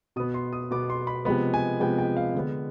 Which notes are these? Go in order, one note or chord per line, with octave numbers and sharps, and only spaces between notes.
B2 B3 D#6
C6
D#6
B2 B3 D6
C6
B5
C3 F3 G#3 B3 B5
G#5
C3 F3 G#3 B3 G5
G5
F5
D3 G#3 B3